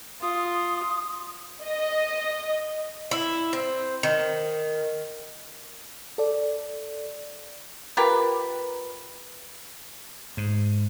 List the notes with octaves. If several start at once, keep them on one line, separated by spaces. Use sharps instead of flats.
F4 D#6
D#5
E4
C4
D#3
A4 D5
F4 G4 A#4 B4
G#2